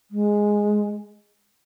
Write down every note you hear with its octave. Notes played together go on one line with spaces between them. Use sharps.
G#3